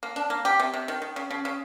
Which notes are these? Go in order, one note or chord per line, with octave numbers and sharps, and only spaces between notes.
A#3
D4
A#3
G4
C3
C3
D#3
D#3
C#3
C#3
C#3